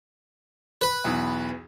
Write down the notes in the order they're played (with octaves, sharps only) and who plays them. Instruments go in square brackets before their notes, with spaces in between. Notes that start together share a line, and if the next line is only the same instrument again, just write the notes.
[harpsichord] B4
[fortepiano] B1 E2